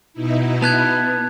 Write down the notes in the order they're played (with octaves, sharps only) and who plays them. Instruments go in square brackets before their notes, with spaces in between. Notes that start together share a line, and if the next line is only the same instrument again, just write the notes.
[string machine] B2 D#4 E4
[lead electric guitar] B3 [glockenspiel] A5 F#6 G#6